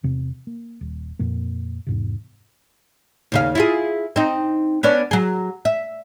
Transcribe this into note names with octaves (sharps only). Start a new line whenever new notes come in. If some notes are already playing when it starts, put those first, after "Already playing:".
E2 C3
A#3
D#1
F2 A#2 A#3
E2 G#2 C3
D#2 C#3 F5
E4 F4 G#4
C4 D#4
B3 C#4 D4
F#3 G#4
E5